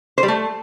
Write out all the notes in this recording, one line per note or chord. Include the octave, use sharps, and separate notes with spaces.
C5
G3
A3